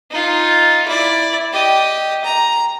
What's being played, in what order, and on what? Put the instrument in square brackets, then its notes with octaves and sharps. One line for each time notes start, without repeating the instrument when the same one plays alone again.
[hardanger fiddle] D#4 F4
E4 D5
G4 D#5
A#5